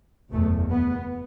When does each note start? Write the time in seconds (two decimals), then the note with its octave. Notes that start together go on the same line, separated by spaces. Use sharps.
0.32 F#1 E2 B2 A3
0.71 B3